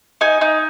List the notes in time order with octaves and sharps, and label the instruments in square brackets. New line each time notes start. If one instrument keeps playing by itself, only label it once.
[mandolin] D#4 G#5
D#4